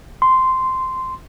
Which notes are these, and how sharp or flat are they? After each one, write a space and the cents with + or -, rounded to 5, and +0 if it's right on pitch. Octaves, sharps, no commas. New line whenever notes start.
C6 -10